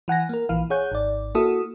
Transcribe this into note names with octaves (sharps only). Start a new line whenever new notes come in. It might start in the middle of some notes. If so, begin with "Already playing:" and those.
E3 F#5 G#5 A#6
A#3 A#4
A#1 E3 F5
G#4 C#5 F#5 G6
G#1 D5
A#3 E4 F#4 A4 D#6